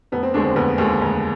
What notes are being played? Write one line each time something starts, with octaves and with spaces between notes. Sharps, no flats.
F1 B3
C4
D#2 D3 G#3 D4
C4
F1 B3
D#2 D3 G#3
F1